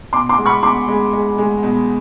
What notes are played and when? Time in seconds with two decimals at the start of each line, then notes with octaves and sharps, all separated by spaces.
0.13 B2 C6 D6
0.29 C6 D6
0.38 G#3
0.46 B5 C#6
0.63 B2 C6 D6
0.88 G#3
1.13 G#3
1.38 G#3
1.63 B2